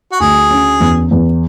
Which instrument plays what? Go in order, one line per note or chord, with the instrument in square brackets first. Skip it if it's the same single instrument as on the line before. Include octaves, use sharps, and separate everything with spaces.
[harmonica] F#4
[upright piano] D2 [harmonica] G#4
[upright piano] C#4
E2
E2